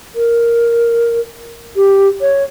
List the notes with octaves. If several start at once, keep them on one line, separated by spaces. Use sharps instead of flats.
A#4
G4
C#5